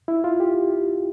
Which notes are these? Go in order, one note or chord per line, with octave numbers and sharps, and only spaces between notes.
E4
F4
G4